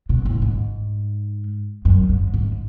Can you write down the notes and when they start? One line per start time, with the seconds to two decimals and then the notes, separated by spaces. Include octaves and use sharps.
0.09 B2
0.25 A2
0.42 G#2
1.85 F#2
2.09 G#2
2.34 G#2